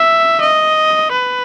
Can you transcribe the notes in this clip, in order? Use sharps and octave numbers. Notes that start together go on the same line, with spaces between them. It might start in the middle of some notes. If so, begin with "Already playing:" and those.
Already playing: E5
D#5
B4